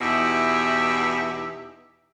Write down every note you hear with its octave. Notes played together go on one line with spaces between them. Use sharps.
E2 B2 D#4 E4 G4 E5